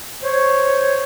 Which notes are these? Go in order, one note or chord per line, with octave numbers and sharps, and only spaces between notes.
C5 C#5